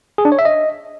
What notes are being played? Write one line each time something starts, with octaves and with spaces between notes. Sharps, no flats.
G#4
D4
C#5
E5
D#5